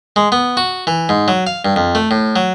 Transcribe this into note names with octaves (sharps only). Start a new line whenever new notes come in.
G#3
B3
F#4
E3
G#2
F#3
F5
G2
F2
A3
A2
F#3